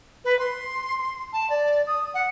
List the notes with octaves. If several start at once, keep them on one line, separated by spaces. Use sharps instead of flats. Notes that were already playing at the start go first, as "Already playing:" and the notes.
B4
C6
A5
D5
D#6
F#5